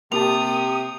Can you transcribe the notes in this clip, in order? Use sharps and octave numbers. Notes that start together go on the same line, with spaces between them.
C3 A#3 G4 A5 D#6 F7